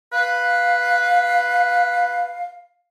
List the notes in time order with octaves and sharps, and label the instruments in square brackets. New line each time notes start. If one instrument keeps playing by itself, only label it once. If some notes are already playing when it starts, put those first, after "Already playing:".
[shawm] B4 [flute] F5